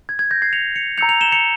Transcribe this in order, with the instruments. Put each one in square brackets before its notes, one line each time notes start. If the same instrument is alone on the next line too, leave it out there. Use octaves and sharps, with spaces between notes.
[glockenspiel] G#6
G#6
G6 A#6
G#6 C7
C#7 F7
C#7 F7
A#5 E6 G6 C#7 F7
C#7 F7
E7 G7
C#7 F7